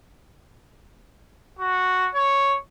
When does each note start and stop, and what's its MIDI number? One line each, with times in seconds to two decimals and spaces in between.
1.59 2.10 66
2.15 2.56 73